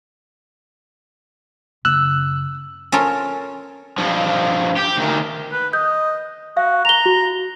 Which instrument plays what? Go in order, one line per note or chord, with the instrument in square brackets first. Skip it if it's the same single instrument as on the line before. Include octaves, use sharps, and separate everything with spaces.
[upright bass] F#2 C#3 [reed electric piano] E6 F#6
[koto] C#4 F4 A4 A#4 C#5
[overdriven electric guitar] G2 F3
G4
D2 D#3
[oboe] B4
[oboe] D#5 [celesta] G6
[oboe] F#4 [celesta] F5
[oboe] A#5 [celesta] F7 G7
[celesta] F#4